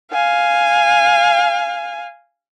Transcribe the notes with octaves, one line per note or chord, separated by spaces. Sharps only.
F5 G#5